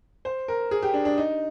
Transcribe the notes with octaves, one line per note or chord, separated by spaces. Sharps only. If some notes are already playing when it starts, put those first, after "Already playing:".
C5
A#4
G#4
G4
D4
D4
D#4